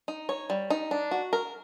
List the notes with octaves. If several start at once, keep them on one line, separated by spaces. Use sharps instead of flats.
D#4
C#5
G3
D#4
D4
F#4
A#4